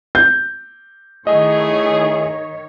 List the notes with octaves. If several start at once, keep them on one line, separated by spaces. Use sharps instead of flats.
G6
D#3 A3 E4 G#4 C#5 D#5